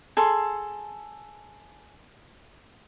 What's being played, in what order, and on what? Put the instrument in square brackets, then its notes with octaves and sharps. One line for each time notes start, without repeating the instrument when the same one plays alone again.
[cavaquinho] G#4 A4 C6